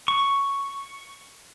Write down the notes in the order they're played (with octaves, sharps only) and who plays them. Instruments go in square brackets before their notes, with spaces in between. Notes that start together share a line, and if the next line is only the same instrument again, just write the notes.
[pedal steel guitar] C#6